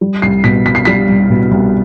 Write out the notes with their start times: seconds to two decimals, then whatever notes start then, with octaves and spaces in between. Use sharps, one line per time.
0.01 G3
0.22 C2 C7
0.44 B2 B6
0.65 C2 B6
0.75 C7
0.85 G3 B6
1.09 C2
1.30 B2
1.51 C2